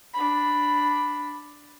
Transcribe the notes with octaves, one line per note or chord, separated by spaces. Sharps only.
D4 B5